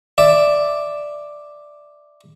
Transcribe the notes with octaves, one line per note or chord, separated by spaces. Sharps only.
D5 E5